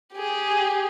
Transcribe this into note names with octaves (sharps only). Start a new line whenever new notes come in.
G4 G#4